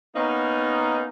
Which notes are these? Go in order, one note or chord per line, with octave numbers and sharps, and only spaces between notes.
A#3 B3 C#4 D#4